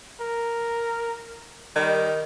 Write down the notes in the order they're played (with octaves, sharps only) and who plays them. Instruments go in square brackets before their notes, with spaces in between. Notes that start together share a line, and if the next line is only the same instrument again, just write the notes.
[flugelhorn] A#4
[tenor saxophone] D#3 [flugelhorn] G3